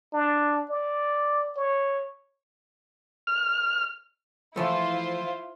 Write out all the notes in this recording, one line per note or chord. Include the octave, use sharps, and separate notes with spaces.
D4
D5
C#5
F6
E3 F3 A3 E4 F4 C5